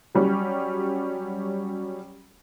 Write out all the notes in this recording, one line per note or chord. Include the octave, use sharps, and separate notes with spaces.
F#3 G3 C#4 G4